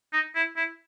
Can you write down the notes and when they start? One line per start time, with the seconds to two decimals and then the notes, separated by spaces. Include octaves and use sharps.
0.13 D#4
0.35 E4
0.57 E4